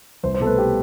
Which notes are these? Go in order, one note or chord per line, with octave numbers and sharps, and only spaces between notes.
C2 C5
C5
B2 A4
A3 B4
G4